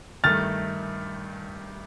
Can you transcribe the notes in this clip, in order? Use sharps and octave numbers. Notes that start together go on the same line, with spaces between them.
G2 D#3 A3 F6 A6